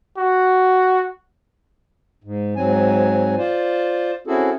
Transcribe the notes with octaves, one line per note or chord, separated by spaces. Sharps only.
F#4
G#2
G#2 F#3 C4 G#5
F4 C5 D5
C4 C#4 E4 F#4 G#4 A4